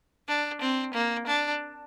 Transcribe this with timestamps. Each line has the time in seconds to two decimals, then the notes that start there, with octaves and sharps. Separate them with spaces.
0.28 D4
0.61 C4
0.94 A#3
1.27 D4